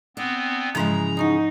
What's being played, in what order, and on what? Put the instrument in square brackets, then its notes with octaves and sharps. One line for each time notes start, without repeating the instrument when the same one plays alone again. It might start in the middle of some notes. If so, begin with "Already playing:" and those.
[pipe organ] B3 C4 [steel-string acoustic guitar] D4
[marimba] G#2 F3 [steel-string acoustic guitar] C#3 E3 G#3 [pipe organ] A#5
[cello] D#4 [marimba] F#5 C#6 D#6